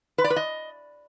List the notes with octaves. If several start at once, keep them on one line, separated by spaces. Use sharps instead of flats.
B4
D5
B4
D#5